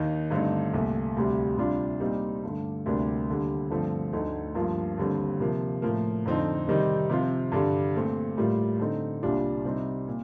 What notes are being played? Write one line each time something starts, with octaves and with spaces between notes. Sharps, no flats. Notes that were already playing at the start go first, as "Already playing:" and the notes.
Already playing: D#2 D#3 A#3 D#4
G2 D3 A3 C4 D#4
C2 A#2 A3
D2 C3 G3
C3 G3 D4 F4
A#2 G3 C4 D#4
G2 D3 A3
D2 C3 G3 A#3 D4
D#2 D3 G3
G2 D3 F3 A3 C4
D2 D3 A3 D#4
G2 F3 A#3 F4
D#2 D3 G3 C4
C3 F3 A#3
A2 F3 A#3
F2 D3 F3 C4 D#4
C3 D#3 G3 C4 D#4
C3 F3 C4 F4
G2 D3 G3
A#2 A3 C4
A2 G3 A#3 F4
D3 A3 C4 D#4
C2 A#2 G3 D4 F4
C3 G3 C4 D#4
A#2